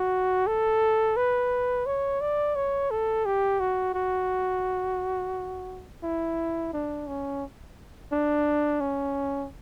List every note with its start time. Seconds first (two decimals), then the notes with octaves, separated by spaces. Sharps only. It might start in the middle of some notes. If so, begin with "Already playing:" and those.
Already playing: F#4
0.47 A4
1.16 B4
1.86 C#5
2.21 D5
2.55 C#5
2.91 A4
3.25 G4
3.60 F#4
3.94 F#4
6.03 E4
6.73 D4
7.07 C#4
8.12 D4
8.80 C#4